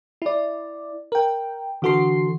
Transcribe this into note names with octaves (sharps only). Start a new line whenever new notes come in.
E4 D5
A#4 G5
D3 E3 F#4 A4 C6 C7